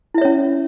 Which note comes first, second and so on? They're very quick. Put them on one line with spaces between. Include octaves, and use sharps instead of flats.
E4 E5 C#5 C#4